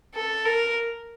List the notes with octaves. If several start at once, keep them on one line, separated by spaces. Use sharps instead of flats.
A4
A#4